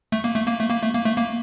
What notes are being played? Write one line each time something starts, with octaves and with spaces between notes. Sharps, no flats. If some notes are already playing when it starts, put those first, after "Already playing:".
A3
A#3
A3
A#3
A3
A#3
A3
A#3
A3
A#3